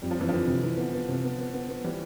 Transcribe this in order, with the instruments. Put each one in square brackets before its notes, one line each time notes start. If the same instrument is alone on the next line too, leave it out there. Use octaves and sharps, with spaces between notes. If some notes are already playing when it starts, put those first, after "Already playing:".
[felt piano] F2 [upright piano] G3
[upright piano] F3
[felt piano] F2 [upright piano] E3
[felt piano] F2 [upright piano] D3 F3
[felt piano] C3
E3
B3
B3
C3
B3
B3
B3
B3
[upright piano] E3 G3